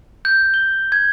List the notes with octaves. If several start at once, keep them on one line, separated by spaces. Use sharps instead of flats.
G6
G7
G#6